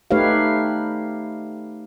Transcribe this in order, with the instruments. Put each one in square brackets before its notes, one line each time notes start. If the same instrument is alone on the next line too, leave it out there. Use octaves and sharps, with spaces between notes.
[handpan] A3 D#4 G4 B4 C#5 F5